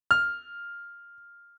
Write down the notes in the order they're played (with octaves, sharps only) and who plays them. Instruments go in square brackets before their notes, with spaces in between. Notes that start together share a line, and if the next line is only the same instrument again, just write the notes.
[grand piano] F6